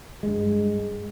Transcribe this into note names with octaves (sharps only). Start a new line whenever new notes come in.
G2 G#3